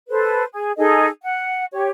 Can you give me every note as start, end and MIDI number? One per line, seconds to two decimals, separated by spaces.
0.10 0.44 69
0.10 0.44 71
0.10 0.44 72
0.52 0.72 68
0.77 1.07 63
0.77 1.07 68
0.77 1.07 69
0.77 1.07 75
1.23 1.65 78
1.73 1.89 67
1.73 1.89 73